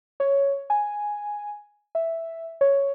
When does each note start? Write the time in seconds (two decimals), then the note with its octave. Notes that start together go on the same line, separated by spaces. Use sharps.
0.20 C#5
0.70 G#5
1.95 E5
2.61 C#5